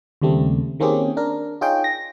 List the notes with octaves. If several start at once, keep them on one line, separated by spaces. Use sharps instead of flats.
D#2 C#3 G3 A3 C4
D#3 A#3 C4 C#4 G4 G#4
D4 A#4
D#4 F4 G#4 C#5 G5
A#6